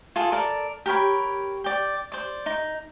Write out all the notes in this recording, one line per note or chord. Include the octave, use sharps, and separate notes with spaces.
F4 G#4 A4
A4 A#4 D5
G4 A#4 C#5 B5
D5 G5
C5 D5
D#4